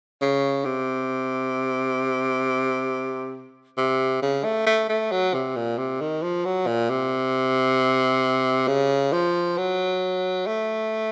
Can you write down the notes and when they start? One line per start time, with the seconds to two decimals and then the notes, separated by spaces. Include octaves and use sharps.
0.21 C#3
0.65 C3
3.77 C3
4.23 C#3
4.44 A3
4.67 A3
4.89 A3
5.12 F#3
5.34 C3
5.56 A#2
5.78 C3
6.01 D#3
6.23 F3
6.45 F#3
6.67 A#2
6.90 C3
8.68 C#3
9.13 F3
9.57 F#3
10.47 A3